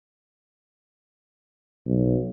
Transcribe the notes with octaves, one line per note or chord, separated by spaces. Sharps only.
B1